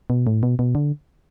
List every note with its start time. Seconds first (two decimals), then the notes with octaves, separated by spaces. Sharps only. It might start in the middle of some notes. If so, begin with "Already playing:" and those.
0.10 B2
0.27 A2
0.43 B2
0.59 B2
0.75 D3